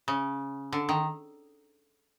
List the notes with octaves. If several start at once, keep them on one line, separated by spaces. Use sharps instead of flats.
C#3
D3
D#3